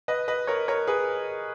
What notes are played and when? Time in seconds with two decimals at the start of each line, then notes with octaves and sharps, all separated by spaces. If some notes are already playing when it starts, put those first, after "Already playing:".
0.08 B4 D#5
0.28 B4 D#5
0.47 A#4 C#5
0.68 A#4 C#5
0.87 G#4 B4